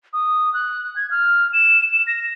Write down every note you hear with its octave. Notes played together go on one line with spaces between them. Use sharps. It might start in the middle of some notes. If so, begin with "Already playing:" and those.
D#6
F#6
G#6
F6
E7
E7
A#6